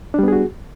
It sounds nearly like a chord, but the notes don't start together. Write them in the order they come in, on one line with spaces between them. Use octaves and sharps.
D4 G3 B3 G#4 F#4